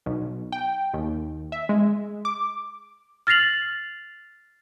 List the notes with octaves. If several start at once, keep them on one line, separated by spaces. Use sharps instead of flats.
B1
G5
D#2
E5
G#3
D6
F6 A6 A#6 C7 F7 F#7